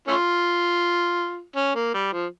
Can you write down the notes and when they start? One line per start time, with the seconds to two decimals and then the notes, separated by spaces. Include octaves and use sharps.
0.08 A3 C#4 F4
1.56 C#4
1.75 A#3
1.94 G3
2.12 F3